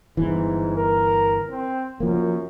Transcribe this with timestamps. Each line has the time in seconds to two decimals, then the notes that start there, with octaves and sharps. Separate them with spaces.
0.17 G1 G#2 E3
0.76 A#4
1.50 C4
2.00 F#2 F3 A#3